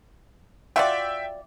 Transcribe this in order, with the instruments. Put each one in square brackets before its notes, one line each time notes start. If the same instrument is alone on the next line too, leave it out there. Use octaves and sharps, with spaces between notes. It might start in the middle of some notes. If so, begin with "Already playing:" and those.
[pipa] F4 F#4 D5 [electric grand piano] E5 G5